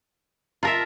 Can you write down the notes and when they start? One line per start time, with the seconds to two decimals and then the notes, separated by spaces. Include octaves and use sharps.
0.63 F4 A#4 E5 A5 A#5